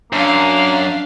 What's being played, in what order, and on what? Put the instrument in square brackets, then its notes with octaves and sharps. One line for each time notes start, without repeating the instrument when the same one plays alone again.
[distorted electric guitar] F#2 [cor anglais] A#3 [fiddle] D4 F5